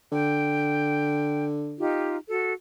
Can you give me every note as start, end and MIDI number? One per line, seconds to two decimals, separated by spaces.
0.12 1.80 50
0.12 1.45 79
1.78 2.16 63
1.78 2.16 65
1.78 2.16 67
2.29 2.53 66
2.29 2.53 69